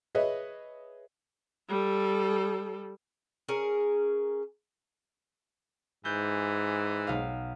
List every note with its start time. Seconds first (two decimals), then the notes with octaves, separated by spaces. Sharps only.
0.15 G#4 B4 C#5 D#5 E5
1.69 G3 A4
3.48 C#4 G#4 A#4
6.05 G#2 E3 G6
7.07 B1 F5